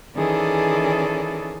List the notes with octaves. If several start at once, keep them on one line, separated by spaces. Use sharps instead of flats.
D#3 E3 C#4 G#4 A4 D5